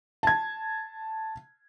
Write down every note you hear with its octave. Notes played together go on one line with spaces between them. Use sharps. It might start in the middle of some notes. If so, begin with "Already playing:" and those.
A5 G#6